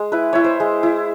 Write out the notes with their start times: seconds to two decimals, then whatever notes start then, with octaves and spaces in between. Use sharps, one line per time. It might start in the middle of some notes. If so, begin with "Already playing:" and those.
Already playing: G#3
0.12 E4 B4
0.33 E4 C#5
0.44 C5
0.60 G#3
0.83 E4